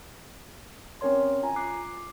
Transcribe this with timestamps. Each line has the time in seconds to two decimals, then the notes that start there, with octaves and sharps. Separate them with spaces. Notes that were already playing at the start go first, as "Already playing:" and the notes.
1.01 C4 C#4 A#4 C#5 C6
1.43 F4 G#5 A#5
1.56 D6 F#6 C7